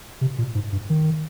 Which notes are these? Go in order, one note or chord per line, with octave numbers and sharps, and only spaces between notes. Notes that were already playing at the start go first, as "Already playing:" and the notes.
C3
A#2
G#2
G2
D#3